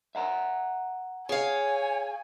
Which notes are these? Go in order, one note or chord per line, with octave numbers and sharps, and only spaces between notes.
E5 F#5 A#5
G#4 C#5 F5 G#5